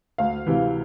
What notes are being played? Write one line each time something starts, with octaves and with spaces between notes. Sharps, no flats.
D2 F5
C3 E3